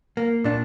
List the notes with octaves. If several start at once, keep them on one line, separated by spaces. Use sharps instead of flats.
A#3
A#2 D4